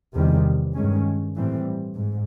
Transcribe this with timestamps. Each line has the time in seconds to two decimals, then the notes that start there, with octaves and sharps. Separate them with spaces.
0.14 E2 C3 D#3 G3
0.74 G2 D#3 G#3 C#4
1.36 A2 E3 G3 C4
1.95 G#2